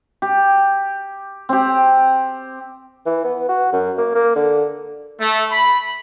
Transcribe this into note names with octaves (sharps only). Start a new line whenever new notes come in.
G4
C4 G4
E3
B3
F#4
F#2
A#3
A#3
D3
A3
B5